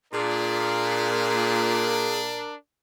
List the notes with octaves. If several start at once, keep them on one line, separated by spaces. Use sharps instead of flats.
A#2 D4 G#4 A#4